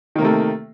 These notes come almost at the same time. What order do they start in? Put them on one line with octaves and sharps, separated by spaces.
D#3 A#3 C3 A3